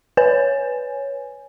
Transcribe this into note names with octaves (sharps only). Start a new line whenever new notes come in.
B4 C#5 G#5